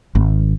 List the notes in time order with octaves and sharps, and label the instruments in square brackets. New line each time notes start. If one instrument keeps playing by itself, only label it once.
[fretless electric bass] G#1